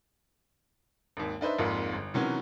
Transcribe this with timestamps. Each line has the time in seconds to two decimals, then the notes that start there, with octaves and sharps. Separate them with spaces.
1.17 G#1 D#2
1.41 D4 D#4 B4 C5 E5
1.58 G#1 F2 G#2 A#3 F4
1.93 G1
2.14 C3 D#3 E3 F#3 B3 C#4